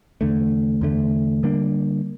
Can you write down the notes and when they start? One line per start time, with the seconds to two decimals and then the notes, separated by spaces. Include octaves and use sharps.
0.21 E2 D3 A3
0.81 E2 D3 A3
1.43 D3 G3 A#3 D4